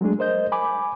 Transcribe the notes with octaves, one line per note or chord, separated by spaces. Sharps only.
F#3 G#3 A3 D4 G#4
A#4 C5 D#5 G6
G#5 B5 D6